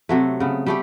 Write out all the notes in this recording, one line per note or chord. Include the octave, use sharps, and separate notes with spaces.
C3 F#3 A3
C#3 B3
G3 A3 G4